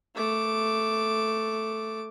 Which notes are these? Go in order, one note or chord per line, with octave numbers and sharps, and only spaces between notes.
A3 D6